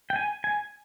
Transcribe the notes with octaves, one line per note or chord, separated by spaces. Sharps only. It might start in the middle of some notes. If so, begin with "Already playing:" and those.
G5
G#5
G#5